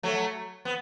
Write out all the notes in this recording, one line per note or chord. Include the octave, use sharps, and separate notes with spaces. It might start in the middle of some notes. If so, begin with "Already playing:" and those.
F#3 A3
B3